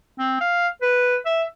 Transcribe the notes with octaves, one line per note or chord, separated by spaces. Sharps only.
C4
F5
B4
E5